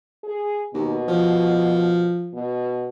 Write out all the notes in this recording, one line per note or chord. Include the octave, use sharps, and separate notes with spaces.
G#4
D#2 B2
F3
B2